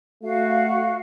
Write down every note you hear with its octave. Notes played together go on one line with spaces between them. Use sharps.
A3 F#4 F5